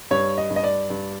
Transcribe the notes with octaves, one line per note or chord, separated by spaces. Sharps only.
G2 C#5
D#5
G2
D#5
D5
G2